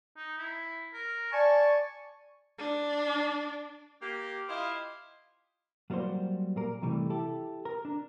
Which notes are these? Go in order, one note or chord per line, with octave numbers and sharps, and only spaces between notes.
D#4
E4
A#4
D5 G#5 A5 C#6
D4
A#3 G4
E4 F4 G4 C5 D#5 F5
F#3 G3 A#3 F#4 C5
A#2 A#3 A#4
C3 E3 G3 A3
E4 G4 A4
A#4
D4